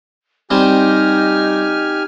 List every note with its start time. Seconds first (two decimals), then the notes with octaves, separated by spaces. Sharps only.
0.51 G3 C4 D#4 G4 G#5 F6